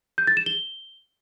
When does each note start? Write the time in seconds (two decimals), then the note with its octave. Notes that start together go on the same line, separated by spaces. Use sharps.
0.18 G6
0.27 A6
0.37 E7
0.46 G7